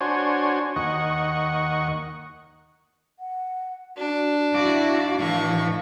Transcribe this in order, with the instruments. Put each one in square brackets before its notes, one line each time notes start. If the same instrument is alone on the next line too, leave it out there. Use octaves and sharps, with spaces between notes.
[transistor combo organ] D4 F#4 C5 C#5 G#5
D#2 D#5 F#5 C#6
[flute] F#5
[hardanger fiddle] D4 [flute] F#4
[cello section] E4 F#4 [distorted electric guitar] D5 [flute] F5
[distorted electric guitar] A2 [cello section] E3 [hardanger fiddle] C#6